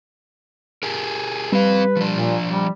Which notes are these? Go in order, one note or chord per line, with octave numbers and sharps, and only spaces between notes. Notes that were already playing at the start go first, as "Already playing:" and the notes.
G4 G#4 A#4
G3 C4 B4 F5
F3 D4
A#2
G3